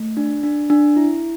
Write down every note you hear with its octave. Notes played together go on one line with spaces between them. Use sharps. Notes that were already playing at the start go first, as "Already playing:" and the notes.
Already playing: A3
D4
D4
D4
E4